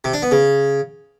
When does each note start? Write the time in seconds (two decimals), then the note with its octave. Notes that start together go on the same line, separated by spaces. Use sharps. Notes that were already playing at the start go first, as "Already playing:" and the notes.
0.04 C3
0.13 D4
0.22 B3
0.31 C#3